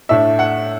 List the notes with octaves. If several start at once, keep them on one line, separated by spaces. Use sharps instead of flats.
A2 A3 D4 E5
F#5